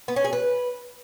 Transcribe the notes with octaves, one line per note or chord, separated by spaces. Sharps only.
B3
C#4
G#4
B4